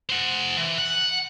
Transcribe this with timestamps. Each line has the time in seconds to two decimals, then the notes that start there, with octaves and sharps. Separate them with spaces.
0.10 C5 F#5
0.57 E3
0.78 F#5